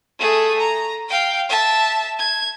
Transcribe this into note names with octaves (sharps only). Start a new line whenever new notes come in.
A3 G#4
A#5
F5 G5
E5 A5
G#6